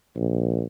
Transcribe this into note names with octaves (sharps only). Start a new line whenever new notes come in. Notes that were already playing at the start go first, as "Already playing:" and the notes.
A#1